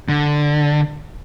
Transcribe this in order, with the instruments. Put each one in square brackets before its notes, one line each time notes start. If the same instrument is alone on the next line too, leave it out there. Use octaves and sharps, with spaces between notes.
[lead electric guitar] D3